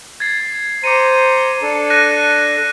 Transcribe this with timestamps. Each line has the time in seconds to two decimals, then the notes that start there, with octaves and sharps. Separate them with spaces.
0.20 G#6 A6 C7
0.84 C5 A#5 D6 C#7 D#7
1.62 D4 A4
1.90 F#6 A#6 D#7